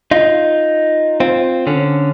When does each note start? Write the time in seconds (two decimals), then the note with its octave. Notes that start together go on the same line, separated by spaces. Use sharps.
0.11 D#4 F4
1.20 C4 F4
1.67 D3 C#4